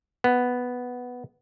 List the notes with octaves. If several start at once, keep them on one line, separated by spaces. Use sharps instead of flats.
B3